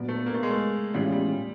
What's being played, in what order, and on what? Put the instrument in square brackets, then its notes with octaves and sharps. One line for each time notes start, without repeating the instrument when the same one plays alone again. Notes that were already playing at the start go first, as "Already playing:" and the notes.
Already playing: [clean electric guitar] A#2 F#3 B3 D4
[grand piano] A3
A#3
A3
G#3
A3
[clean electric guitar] A2 E3 G#3 C#4 F4 [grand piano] G3
[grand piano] G3